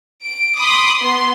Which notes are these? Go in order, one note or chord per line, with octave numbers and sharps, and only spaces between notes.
D7
B5 C6 D6 D#6
B3 C6